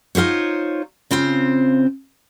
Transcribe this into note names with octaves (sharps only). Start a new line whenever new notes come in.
D#4 F4 G#4 C5 C#5
C#3 C4 F4 C5